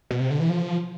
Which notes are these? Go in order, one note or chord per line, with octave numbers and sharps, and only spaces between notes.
B2
C3
D3
E3
F3